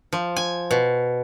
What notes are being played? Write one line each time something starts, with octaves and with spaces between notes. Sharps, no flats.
F3
G#5
B2